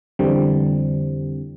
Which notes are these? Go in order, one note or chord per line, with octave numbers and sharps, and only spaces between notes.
F2 D3 E3 G3 C4